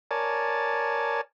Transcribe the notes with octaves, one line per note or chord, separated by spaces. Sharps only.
A#4 C#5 D5 G#5 A5